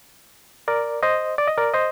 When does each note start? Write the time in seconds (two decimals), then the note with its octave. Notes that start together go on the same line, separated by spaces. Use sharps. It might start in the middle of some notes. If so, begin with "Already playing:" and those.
0.68 A#4 D5
1.03 C5 D#5
1.38 D5
1.48 D#5
1.58 A#4 D5
1.74 C5 D#5